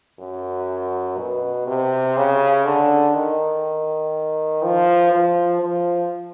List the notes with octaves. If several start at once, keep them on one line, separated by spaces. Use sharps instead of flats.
F#2
B2
C3
C#3
D3
D#3
F3
F3
F3